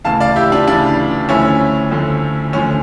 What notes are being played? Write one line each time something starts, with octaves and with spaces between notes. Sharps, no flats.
D2 C#3 E3 F5 A5
D5 F5
E4 G4
D4 F4
D2 C#3 E3 D4
D2 D3 F3 C#4 E4
D2 D3 F3
D2 D3 F3 C#4